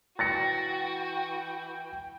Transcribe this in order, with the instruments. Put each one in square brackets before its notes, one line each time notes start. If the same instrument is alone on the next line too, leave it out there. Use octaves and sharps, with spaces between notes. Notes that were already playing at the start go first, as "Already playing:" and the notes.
[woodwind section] E3 G5 [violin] F#4 [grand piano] A6 A#6 C#7